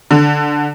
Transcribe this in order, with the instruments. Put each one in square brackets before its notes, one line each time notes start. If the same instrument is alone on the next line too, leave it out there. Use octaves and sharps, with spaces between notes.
[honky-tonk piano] D3